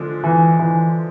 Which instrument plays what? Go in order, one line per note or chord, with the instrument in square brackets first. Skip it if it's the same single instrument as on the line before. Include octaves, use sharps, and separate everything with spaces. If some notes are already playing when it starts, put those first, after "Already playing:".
Already playing: [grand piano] D3 F3 G#3 D4
[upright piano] E3
E3